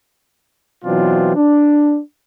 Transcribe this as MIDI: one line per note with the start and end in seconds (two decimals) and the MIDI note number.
0.84 1.32 47
0.84 1.32 52
0.84 1.32 54
0.84 1.32 60
0.84 1.32 62
0.84 1.32 65
1.35 1.99 62